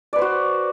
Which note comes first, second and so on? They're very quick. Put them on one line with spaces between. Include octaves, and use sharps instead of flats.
D5 B4 C5 F#4